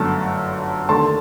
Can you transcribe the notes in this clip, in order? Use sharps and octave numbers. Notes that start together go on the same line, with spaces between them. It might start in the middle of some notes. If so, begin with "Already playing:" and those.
Already playing: G1 F#2 D3 A3 A5
D#2 D3 A3 A5 C6